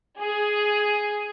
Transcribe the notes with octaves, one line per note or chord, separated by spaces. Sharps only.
G#4